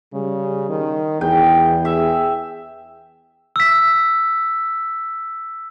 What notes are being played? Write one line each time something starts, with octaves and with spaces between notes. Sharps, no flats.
C#3 G3
D#3
E2 G#4 G5
E5
E6 B6